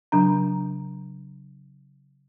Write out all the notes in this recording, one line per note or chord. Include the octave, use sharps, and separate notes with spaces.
C#3 F#3 D4 A#5